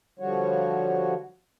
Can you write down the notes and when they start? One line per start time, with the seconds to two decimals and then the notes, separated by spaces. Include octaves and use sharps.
0.19 D3 F3 G3 F#4 C#5